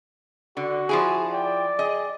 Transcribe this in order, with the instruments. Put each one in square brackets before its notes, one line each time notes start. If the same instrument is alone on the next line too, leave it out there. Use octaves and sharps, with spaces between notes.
[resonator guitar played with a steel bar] D3 [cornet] F#4
[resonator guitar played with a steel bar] F3 E4 G#4 [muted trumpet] G#5
[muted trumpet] D5 [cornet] G5
[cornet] G#4 [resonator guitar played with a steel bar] D#5